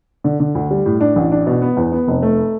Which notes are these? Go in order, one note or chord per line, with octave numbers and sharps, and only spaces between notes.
D3
D3
D2
G3
A2
D4
A1
D4
B2
B3
E2
B3
F1
A3